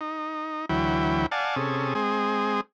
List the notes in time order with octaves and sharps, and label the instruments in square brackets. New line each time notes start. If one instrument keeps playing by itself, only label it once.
[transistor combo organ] D#4
D2 E3 F#3 E4 G5
D5 F5 F#5 G#5 A5
C3 C#4 G#4 A4
G#3 C4 G#4